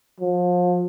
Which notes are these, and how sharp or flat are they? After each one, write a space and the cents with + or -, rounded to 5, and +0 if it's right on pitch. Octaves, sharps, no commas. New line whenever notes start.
F3 +35